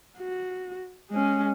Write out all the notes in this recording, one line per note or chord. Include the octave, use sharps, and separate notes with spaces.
F#4
G#3 C#4